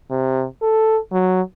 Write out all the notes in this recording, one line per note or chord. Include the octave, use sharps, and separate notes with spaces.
C3
A4
F#3